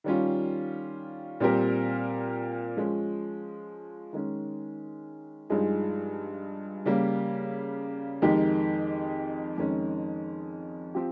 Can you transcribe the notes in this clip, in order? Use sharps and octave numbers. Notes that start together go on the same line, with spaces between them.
D#3 G3 C#4 F4
A#2 G3 C4 G4 A#4
F3 G#3 C#4
D#3 G#3 C#4
G2 F3 G#3 D#4 G#4
C#3 G3 A#3
F2 D#3 G#3 D#4 G4
F2 D#3 G#3 C#4
F3 C4 G4